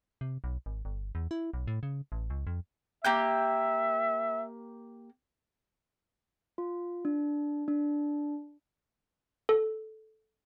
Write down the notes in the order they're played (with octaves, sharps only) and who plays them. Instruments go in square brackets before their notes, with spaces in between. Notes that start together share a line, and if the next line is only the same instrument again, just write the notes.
[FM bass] C3
B1
G#1
G1
E2
E4
B1
A2
C#3
A1
C#2
F2
[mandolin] A#3 G4 G6 [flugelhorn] E5
[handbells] F4
D4
D4
A4